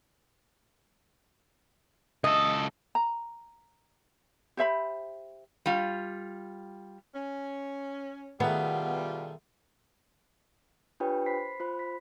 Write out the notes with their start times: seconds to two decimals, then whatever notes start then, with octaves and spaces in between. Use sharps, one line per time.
2.24 C#2 A4 D#5
2.95 A#5
4.57 G4 C5 E5 B5
5.66 G3 F4
7.14 C#4
8.40 B2 D#3 G3 A3 B3 F4 G#4
11.00 D4 F4 G4 B4 C#5 G5
11.26 C5 B5 B6 C7
11.60 F4 C5 B5
11.79 B6